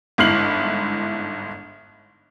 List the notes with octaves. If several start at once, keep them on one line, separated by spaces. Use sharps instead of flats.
G1 G#2 E4 F6 C7 F#7